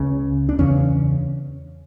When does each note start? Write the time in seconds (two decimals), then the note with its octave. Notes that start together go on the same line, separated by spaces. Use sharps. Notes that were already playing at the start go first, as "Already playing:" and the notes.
Already playing: C#2 C#3
0.49 D4
0.59 E2 C#3 C#4